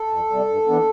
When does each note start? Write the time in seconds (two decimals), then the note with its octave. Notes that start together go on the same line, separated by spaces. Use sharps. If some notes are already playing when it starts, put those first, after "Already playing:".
Already playing: A4
0.10 F2
0.30 C3 G3
0.48 G2
0.67 E3 B3 D4